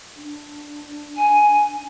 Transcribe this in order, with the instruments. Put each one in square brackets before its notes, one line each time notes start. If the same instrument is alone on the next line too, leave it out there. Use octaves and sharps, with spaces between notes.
[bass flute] D4
[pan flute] G#5